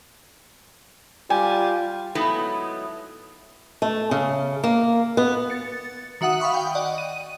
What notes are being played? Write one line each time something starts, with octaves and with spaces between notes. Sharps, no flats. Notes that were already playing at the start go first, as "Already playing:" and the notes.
G3 F4 G#5
F#3 G#3 A3 B3 D#4 E4
A3
C#3
A#3
B3
A6 C#7
D#3 F#4 E5 F#5 D#6
F5 F#5 B5 C#6 D#6
G5
D5 D#5 F#5
D#7